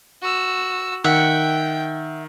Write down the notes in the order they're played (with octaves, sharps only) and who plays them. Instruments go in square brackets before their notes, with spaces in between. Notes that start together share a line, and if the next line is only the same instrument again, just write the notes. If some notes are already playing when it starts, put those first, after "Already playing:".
[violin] F#4 E6
[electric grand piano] D#3 [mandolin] E5 F#5 [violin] G5